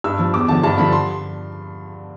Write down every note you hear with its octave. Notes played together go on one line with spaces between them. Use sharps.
G2 E6
F3
E2 D6
D3 F3 A5
G2 A5
D3 F3 B5
C6